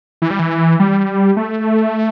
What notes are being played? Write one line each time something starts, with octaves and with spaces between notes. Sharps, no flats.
E3
G3
E3
G3
A3